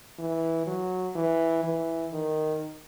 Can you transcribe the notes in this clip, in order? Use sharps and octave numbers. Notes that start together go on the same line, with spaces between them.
E3
F#3
E3
E3
D#3